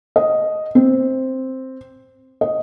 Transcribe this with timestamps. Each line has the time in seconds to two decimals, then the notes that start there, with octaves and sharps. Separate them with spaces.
0.16 D#5
0.75 C4
2.41 D#5